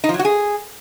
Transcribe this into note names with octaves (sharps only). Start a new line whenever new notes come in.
D#4
F3
F#3
F#4
G#4